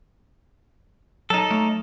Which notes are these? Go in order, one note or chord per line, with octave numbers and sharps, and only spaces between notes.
F#3 D#4 A4
F#3 A3